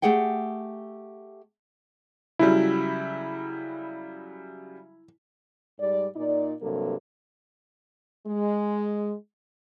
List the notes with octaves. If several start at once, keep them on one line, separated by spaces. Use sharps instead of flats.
A3 G4 G#4 F#5 G5
C#3 F#3 G3 E4
G#2 G3 D5
A#2 D#4 D5
G2 C3 F#3 A#3 A4
G#3